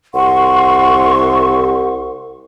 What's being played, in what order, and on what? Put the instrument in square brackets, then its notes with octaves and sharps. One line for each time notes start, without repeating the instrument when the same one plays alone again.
[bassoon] C2 [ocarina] F#5 [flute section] C6 C#6